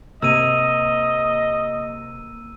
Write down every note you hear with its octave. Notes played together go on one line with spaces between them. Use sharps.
C3 A#3 D#5 E6 D#7